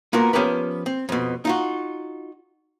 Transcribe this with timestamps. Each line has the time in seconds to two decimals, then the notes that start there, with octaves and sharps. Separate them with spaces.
0.13 A#3 B3 F4 F#4 A#4
0.33 F3 B3 C#4 G4 A#4 B4
0.86 C4
1.09 F2 B2
1.45 D#4 F4 F#4